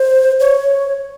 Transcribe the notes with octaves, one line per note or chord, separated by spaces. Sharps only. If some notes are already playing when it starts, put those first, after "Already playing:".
Already playing: C5
C#5